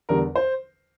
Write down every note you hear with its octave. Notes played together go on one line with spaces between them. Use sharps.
E2 D3 G3 A#4
C5